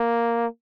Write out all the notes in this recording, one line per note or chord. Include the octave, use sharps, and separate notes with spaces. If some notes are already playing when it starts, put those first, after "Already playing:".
Already playing: A#3